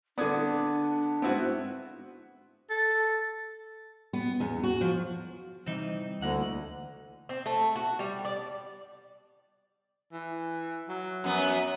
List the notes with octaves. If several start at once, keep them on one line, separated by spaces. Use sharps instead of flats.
D3 B3 D4 D5 D#6 G#6
G#2 B3 C4 E4 F#4
A4
B3
E2
F#4
F3
C3 E3 G3 C4 D#4
D2 A#3 E4 D#5 F#5
C4
A3
F#4
G3
D5
E3
F#3
F#2 B3